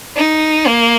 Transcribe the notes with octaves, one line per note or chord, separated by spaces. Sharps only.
D#4
A#3